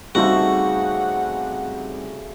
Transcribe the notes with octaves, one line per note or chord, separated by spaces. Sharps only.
C#3 G3 A3 C4 D#4 F#4 C5 F#5